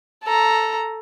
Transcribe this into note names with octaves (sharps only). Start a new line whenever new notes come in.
A4 A#5